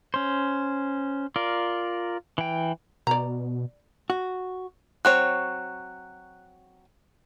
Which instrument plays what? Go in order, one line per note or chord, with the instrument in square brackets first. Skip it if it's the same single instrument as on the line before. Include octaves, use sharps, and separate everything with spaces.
[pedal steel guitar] C#4 C5
F4 A#4 D5
E3 G5
[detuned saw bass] B2 [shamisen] D5 A#5
[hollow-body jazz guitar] F#4
[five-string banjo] F#3 C4 C#5 [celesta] F#6